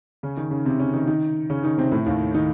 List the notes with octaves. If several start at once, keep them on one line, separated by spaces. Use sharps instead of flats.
C#3 C#4
D#3 D#4
C#3 C#4
C3 C4
C#3 C#4
D#3 D#4
D#3 D#4
C#3 C#4
D#3 D#4
C3 C4
A2 A3
D#2 D#3
D#3 D#4